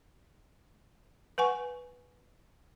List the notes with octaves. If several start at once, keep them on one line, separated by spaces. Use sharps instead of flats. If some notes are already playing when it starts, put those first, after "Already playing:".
B4 F#5 G#5 C#6